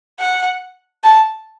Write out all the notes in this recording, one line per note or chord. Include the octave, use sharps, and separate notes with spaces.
F#5
A5